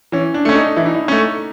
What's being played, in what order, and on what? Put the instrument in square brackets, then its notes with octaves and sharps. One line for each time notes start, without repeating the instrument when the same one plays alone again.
[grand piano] E3 [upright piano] C#4
[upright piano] D4
[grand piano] A3 C#4
[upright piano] D#4
[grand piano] E3 [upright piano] E4
[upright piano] D#4
E4
[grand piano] A3 C#4